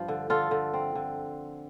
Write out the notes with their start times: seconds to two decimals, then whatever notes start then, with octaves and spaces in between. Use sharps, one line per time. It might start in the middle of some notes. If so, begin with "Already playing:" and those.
Already playing: G2 F3
0.08 D3
0.30 D3 F4 A4
0.51 D3
0.74 C4
0.95 D3